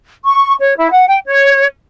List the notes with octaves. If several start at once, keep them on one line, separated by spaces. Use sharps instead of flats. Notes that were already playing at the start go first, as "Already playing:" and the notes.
C#6
C#5
E4
F#5
G5
C#5